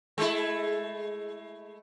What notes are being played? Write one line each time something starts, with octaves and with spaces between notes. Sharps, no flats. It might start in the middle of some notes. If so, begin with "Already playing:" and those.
G#3 A3 E4